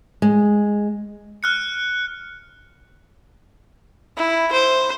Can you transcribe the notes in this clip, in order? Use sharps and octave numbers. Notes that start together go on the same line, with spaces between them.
G#3
F6 F#6 C#7
E4
C5